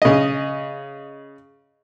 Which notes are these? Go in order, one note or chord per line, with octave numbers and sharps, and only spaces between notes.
C#3 D#5